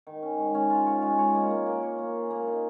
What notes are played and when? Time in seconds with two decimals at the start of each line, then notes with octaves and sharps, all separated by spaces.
0.07 D#3
0.22 C#4
0.38 G#2
0.54 C#4
0.70 F4
0.86 C#5
1.02 G#3
1.18 C#5
1.34 A#3
1.50 A#3
1.66 A#3
1.83 C#5
1.98 A#3
2.15 G#4
2.30 A#3
2.47 D#4